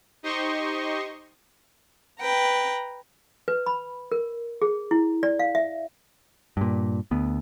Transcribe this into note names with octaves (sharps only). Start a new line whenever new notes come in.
D#4 G4 C5 D#5 C6 C#6
B4 G5 A#5
B4
B5
A#4
G#4
E4
D5
F5
E5
G2 A#2
D2 B3